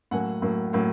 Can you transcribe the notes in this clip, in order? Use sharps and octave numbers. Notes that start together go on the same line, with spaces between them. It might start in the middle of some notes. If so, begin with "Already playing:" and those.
A2 F#3 A#3 F#5 G#5
A2 F#3 A#3
A2 F#3 A#3